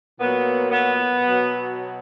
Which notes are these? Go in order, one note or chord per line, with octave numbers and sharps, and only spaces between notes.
A#2 F#3 B3
B3
B2 F#3